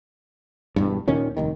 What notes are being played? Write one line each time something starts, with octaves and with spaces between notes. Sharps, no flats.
E1 G2
D#2 A#2 D#3 C#4
F1 D#2 D#3